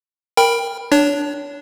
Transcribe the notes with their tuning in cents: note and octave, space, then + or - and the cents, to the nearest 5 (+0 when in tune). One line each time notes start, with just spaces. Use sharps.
A#4 +0 G5 +15 B5 -5
D4 +0 C#5 +30